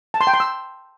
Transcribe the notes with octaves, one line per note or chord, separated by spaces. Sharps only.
A5
C6
G5
C6
E6